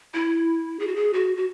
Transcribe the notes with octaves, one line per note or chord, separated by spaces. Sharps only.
E4
G#4
F#4
G#4
F#4
F#4